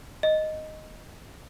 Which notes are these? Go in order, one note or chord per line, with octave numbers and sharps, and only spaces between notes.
D#5